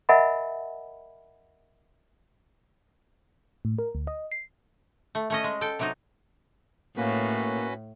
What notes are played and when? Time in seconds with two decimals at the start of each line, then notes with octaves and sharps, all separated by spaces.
0.09 A#4 D#5 E5 F#5 G#5 B5
3.65 A2
3.78 A#4
3.95 D2
4.07 D#5
4.32 C7
5.15 A3
5.30 A3 C#4 D#5
5.44 G#3
5.61 A4 G5
5.79 C3 F#3 D#4
6.97 A2 A#3 C#4 F#4 B4